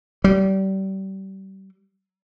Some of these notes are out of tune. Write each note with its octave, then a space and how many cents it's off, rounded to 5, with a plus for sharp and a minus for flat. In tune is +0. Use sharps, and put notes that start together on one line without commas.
G3 -30